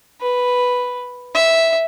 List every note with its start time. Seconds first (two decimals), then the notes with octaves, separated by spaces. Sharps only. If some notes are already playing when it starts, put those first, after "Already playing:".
0.22 B4
1.35 E5